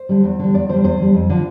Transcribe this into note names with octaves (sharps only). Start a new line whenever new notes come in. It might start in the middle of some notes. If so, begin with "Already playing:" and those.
Already playing: C5
D3 G3
E2
D3 G3
E2 D5
D3 G3 C5
E2 C5
D3 G3
F2
D3 F3